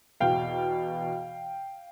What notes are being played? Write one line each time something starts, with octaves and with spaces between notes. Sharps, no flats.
E2 B2 F5 G5